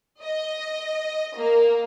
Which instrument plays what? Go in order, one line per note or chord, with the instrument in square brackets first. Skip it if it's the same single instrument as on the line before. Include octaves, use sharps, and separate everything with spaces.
[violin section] D#5
A#3